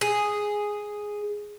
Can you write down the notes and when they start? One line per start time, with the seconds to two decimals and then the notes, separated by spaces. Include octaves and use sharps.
0.01 G#4